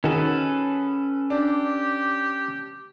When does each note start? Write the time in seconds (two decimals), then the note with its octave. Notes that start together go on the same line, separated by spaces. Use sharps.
0.04 D#3 C#4 F#4 G#4 A4 B4 F#5
1.30 D4 G4